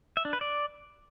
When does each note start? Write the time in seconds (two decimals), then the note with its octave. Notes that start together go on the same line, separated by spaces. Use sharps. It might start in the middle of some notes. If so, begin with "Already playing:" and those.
0.17 E5
0.25 D4
0.33 B4
0.41 D5